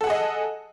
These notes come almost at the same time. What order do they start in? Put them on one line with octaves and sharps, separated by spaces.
A4 F#5 G#4 D#5